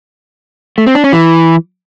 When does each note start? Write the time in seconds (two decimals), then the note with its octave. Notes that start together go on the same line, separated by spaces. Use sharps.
0.78 A3
0.86 C4
0.95 D4
1.04 C#4
1.13 E3